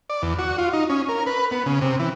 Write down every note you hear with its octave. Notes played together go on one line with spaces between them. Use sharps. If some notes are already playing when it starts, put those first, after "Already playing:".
D5
E2
F#4
F4
D#4
C#4
A#4
B4
B3
C#3
C3
E3